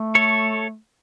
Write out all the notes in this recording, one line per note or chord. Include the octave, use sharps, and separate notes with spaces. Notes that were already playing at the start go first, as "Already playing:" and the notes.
Already playing: A3
A4 C#5